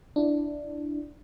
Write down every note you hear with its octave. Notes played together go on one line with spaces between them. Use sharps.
D4 E4